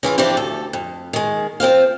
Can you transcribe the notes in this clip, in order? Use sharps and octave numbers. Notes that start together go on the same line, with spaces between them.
C#3 E3 E4 F4
E3 F3 C4 D4 F4 G4
D2 A4
F2
D#3 G#3
F3 C4 C5 F5